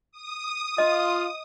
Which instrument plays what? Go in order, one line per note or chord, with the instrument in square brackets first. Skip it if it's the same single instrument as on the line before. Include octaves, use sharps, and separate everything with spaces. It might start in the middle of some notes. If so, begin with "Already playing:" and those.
[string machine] D#6
[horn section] F4 [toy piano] D#5